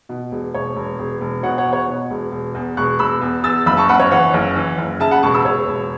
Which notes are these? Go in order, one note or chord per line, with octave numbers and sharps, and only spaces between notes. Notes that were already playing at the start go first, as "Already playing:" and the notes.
B2
E1
E1 C#5
E1
E1
E1
B2 C#5 F#5
C#5 F#5
E2
C#5 F#5
B2
E1
E1
E2
E1 C#6 F#6
E1 B5 E6
E2
E2 E6 A6
F#1 B5 E6
A5 C#6
F#1 F#5 B5
C#5
E3 C#5 F#5
F#1
E3
F#1
C#3 E5 A5
F#5 B5
E1 A5 C#6
B5 E6
E1 C#5
E1